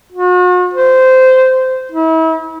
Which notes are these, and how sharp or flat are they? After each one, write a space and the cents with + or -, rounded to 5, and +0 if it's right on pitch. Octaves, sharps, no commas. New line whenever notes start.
F#4 -45
C5 -15
E4 -40